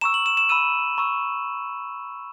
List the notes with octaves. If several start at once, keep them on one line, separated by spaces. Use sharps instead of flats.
A#5 C#6 E6 E7
F#7
E7
E7
B5 E6 D#7
A#5 C#6 E6